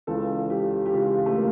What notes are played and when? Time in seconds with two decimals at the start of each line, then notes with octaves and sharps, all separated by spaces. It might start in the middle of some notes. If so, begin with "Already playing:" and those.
0.07 C#2 C#3 E3 A4
0.50 G4
0.86 G4
0.93 C#2 C#3 E3 F4
1.26 A3
1.36 A#3